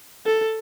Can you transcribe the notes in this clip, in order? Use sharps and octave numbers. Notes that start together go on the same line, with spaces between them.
A4